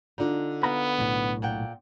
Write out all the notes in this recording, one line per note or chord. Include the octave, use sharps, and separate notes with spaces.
D3 D4 D#4 F4
B3 F5 A#5 B5
B1 A2
A#2 F#5 G5